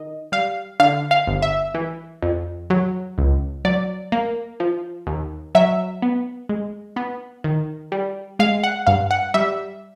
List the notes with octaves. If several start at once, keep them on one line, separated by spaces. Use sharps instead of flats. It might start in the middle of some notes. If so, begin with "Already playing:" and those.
Already playing: D#3 D#5
G3 F5
D3 F5
F5
G1
E5
E3
F2
F#3
C#2
F#3 D5
A#3
F3
D#2
F#3 E5
B3
G#3
B3
D#3
G3
G#3 F5
F#5
G2 F5
F#5
G3 E5